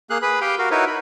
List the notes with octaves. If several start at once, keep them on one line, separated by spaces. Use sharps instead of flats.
A#3 G#4 F5 F#6
G#4 B4 B5
G4 F5 G5
F#4 A#4 F5
D#4 E4 F#4 A#4 B4 C#5
B5